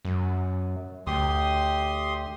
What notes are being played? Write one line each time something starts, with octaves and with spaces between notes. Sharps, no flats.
F#2
D2 G4 C6 D#6